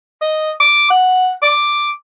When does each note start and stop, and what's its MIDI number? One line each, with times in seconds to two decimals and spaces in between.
0.21 0.51 75
0.60 0.88 86
0.90 1.31 78
1.42 1.88 86